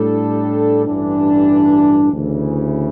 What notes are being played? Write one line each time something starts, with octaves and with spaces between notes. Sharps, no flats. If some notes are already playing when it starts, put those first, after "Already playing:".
Already playing: A2 G3 D4 A4
A1 G2 E3 G3 D4
D2 C#3 E3